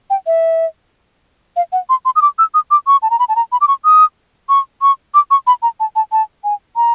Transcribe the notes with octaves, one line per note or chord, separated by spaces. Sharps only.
G5
E5
F5
F#5
C6
C6
D#6
D6
E6
D#6
D6
C#6
A5
A#5
B5
A5
A#5
B5
D6
C#6
D#6
C#6
C#6
D6
C#6
B5
A#5
A5
A5
A5
G#5
A#5